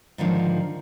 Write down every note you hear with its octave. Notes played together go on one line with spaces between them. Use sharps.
G#2 D3 D#3 F3